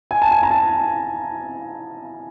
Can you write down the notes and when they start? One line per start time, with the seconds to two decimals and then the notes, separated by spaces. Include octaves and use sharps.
0.11 G#5
0.22 A5
0.31 G#5
0.43 A#5
0.51 A5